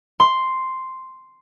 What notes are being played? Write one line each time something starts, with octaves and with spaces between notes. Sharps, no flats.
C6